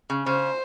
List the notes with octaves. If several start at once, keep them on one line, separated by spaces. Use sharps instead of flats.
C#3
C#3 C5